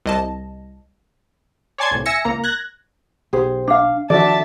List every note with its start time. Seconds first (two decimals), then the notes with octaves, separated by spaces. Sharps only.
0.06 C2 D#5 A5
1.78 C#5 D5 G#5 A5 C6 G#6
1.91 C2 A2
2.06 E5 G#5 E6 A#6 C#7
2.25 C#2 A#3 A#5
2.44 F#6 G#6 A#6
3.33 B1 G4 G#4 C5
3.68 D4 F5
4.10 D#3 F3 D4 F#4 A4 D5 E5 A5